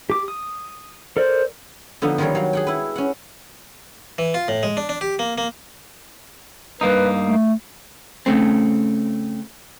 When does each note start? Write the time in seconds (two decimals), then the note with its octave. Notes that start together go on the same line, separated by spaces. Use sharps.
0.10 G4 D6
0.28 D#6
1.17 A4 A#4 C5 D5
2.02 D3 F3 B3 D#4
2.18 D#3 F3 G3 A#4 C#5
2.35 F#3 F5
2.53 G#4 F#5 G5
2.67 E4 B4
2.96 C#4 F#5
4.18 E3
4.34 F4
4.48 A2
4.63 G#3
4.77 D4
4.89 D4
5.01 G4
5.19 A#3
5.38 A#3
6.81 G2 A#3 D#4 B4
7.23 A3
8.26 C#3 A3 C4